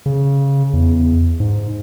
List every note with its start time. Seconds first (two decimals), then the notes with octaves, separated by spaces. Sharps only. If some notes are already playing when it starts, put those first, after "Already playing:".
0.06 C#3
0.73 E2
1.40 G#2